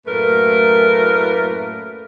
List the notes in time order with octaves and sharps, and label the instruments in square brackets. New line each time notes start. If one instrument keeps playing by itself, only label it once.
[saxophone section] F#2 A2 A3 A#3 A#4 B4